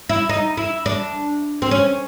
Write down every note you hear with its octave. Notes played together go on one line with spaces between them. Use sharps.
E4
D#4
E4
D4
C4
C#4